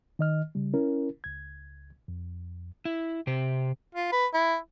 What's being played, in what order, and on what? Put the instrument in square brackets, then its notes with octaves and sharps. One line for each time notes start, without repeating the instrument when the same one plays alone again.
[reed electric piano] D#3 D#5 F6
C#3 G3
C#4 E4 A#4
C#2 G#6
F2
[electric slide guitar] E4
C3 G4 C5
[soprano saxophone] F4
B4
E4